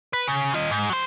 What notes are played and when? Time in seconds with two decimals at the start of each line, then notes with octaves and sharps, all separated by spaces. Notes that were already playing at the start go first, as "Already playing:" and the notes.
0.13 B4
0.28 C#3
0.54 F4 D#5
0.71 G#2
0.90 F#3 C5